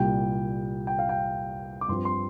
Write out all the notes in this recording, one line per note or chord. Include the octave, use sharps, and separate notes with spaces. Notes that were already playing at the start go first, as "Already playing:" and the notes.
Already playing: C2 A#2 G3 G5
G5
F5
G5
D6
G2 F3 C4 C6
C6